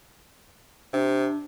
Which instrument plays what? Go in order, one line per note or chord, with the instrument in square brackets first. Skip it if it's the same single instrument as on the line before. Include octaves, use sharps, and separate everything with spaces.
[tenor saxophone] C3 [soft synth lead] D4